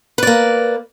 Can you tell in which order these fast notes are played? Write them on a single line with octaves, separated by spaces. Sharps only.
B4 D5 A#3